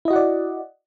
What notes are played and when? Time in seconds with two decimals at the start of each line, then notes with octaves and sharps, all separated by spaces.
0.05 E4
0.08 D#5
0.10 F#4
0.13 F#5
0.16 D5